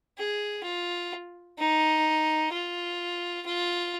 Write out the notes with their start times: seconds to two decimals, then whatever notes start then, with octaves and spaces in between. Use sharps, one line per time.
0.18 G#4
0.64 F4
1.59 D#4
2.53 F4
3.46 F4